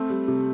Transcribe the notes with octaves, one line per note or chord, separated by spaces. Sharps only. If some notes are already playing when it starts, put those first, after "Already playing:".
Already playing: A3 C4
G3
C3